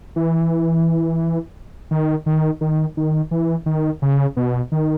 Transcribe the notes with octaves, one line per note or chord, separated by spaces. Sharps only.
E3
D#3
D#3
D#3
D#3
E3
D#3
C#3
B2
D#3